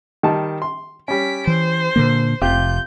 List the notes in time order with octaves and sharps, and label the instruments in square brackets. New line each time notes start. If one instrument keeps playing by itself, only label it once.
[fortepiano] D#3 G3 A5
C6
[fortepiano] G3 C#4 [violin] B6 D7
[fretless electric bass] E3 [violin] C5
[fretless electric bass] A#2 D3 A#3
[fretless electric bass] F1 [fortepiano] C3 F4 G4 [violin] G6